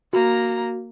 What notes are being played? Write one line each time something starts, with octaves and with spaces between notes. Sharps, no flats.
A#3 F#4 A#5